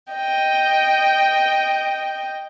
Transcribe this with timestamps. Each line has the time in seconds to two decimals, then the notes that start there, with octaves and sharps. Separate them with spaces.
0.13 D#5 G5